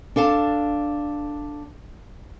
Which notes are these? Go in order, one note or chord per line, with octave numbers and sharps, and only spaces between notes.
D4 A4 F5 A5